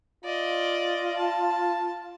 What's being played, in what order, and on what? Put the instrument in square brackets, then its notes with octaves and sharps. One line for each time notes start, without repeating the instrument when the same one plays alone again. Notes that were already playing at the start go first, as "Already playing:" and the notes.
[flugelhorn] F4 [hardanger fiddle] D5 D#5
[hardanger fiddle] A5